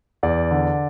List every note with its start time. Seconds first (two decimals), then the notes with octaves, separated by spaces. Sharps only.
0.23 E2 D5
0.51 D3